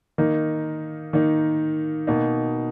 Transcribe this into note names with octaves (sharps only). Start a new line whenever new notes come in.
D#3 A#3 D#4
D#3 A#3 D#4
B2 A#3 D#4